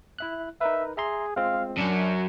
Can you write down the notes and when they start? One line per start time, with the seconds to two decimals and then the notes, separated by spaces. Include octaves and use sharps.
0.19 E4 E5 F#6
0.61 D#4 A#4 B4 E5
0.97 G#4 E5 A#5 C6
1.36 G#3 C4 F4 F5
1.78 F#2 F#3 D4 C#7